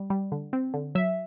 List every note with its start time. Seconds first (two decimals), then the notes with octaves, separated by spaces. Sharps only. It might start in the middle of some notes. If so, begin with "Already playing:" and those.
Already playing: G3
0.10 G3
0.32 D3
0.53 C4
0.74 D3
0.95 F#3 E5